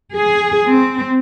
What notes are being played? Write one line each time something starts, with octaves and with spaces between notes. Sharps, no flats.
G#4
C4